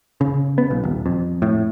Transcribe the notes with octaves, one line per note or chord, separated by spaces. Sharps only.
C#3
B3
B1
D#1
F2
A2